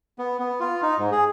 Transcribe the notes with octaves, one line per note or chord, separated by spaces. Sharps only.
B3
B3
F4
D#4
G#2
G#4